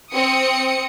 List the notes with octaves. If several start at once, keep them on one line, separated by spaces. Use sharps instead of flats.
C4 D#6 C#7